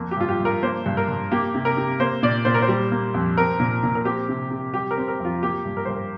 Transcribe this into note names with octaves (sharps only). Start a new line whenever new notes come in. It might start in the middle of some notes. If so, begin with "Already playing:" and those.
Already playing: F2 A#3
G4
G2 F4
G4
G2 A#4
A#3 C5
G2
A#4
G2
A#3 G4
C3
A#4
C3
A#3 C5
A#2 D5
A#2 C5
A#4
C5
G3
A#3
F2
C4 A#4
A#2
A#2
A#4
C4 G4
C3
C3
G3 G4
A#4
C4
A#4
F2 F4
A#3 G4
G2
A#4
G2 C5
A#4